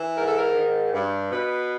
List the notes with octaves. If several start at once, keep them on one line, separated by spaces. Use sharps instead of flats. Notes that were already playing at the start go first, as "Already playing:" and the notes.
Already playing: E3
G#2 A#4
A4
A#4
D#3
G2
B2 B4